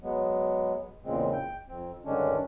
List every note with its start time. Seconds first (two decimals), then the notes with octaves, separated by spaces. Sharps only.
0.02 F#3 G#3 B3
1.04 E2 A#2 C#3 G#3 C4
1.33 G5
1.69 F2 C4
2.05 G2 D3 D#3 G#3 C#4 D4